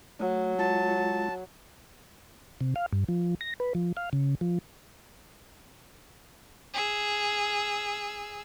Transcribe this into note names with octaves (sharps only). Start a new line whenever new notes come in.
F#3 A3
G#3 F4 A5
C3
F5
G2
F3
A#6
B4
F3
F5
C#3
F3
G#4 E6